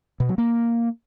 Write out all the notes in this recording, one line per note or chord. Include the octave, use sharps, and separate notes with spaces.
B2
F#3
A#3